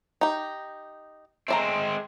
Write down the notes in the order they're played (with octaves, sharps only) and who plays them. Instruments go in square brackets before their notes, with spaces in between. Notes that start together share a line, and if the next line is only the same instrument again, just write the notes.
[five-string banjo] D#4 G4
[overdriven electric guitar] G#3 C4 [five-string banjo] A3 D5 A#5